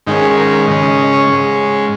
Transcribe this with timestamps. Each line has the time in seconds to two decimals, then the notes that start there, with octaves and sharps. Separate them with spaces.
0.07 G#2 D#3 G#3 C#4 D#4
0.22 G#4
0.37 A#4
0.52 A#4
0.67 C#3 G#3 C#4 D#5
0.82 D#5
0.98 D#5
1.13 C#5
1.28 G#2 G#3 C#4